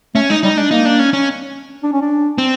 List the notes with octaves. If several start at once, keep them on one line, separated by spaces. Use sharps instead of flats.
A3 C#4
G#3 D#4
G3 D#4
G#3 D4
A#3 D#4
D4
C#4
C#4
D4
C#4
D4
C4